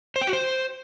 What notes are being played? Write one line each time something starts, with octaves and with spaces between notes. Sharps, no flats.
C5
G5
F#4
C5